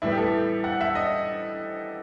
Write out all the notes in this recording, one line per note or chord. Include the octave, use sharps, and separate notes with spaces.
A2 E3 G3 B3 E4
G4
A4
F#5
E5
D#5